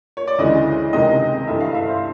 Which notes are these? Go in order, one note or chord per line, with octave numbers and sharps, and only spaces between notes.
C#5
D5
D2 C#3 E3 G#3 D#5
C#2 C3 D#3 G#3 C4 D#5
G2 E3 A3 E5
F5
E5
C5